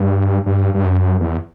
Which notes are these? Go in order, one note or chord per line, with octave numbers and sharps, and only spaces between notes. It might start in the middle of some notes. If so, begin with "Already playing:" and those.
Already playing: G2
G2
G2
F#2
E2